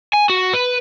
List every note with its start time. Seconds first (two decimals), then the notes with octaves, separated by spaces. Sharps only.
0.13 G#5
0.30 F#4
0.54 B4